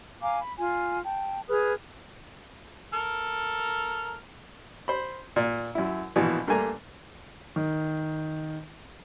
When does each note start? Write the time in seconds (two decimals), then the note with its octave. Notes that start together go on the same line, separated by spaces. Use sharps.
0.22 F5 G#5 A#5 D6
0.40 B5
0.58 F4 G#5
1.05 G5 A5
1.49 G#4 B4 D#6 F6
2.93 A4 A#4 F6
4.88 C5 B5
5.36 A#2
5.75 F#2 E4
6.16 A#1 B2 E3
6.48 G2 A3 A#3 G#5 A#5
7.56 D#3